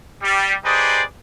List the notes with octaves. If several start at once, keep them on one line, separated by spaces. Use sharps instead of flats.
G3
D#4 G4 G#4 B4 C5 D5